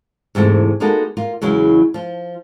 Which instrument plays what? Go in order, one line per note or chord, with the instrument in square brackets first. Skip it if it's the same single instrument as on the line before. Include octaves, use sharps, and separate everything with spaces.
[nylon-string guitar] E2 G#2 C3 A3
G#3 A#3 B3 D#4 F#4 A4
A#3 F4
E2 C#3 F#3 G#3 E4
F3 F4